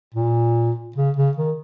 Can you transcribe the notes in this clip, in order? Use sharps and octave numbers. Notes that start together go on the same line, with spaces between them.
A#2
C#3
C#3
D#3